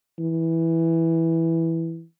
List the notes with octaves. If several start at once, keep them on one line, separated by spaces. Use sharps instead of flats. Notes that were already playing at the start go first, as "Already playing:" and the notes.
E3